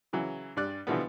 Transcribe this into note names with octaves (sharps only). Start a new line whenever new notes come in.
C#3 E3 F#3
G2 G3 D5 F#6
B2 D3 E3 F3 G3 B3